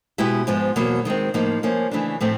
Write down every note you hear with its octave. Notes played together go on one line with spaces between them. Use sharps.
B2 G#3 B3 E4 G4
G#2 F3 G#3 B3
E2 B2 F#3 A#3
D#3 G#3 C4
A2 F3 A#3 D#4
F3 A#3 C#4
C#3 E3 A3 D4
A2 F3 A3 C4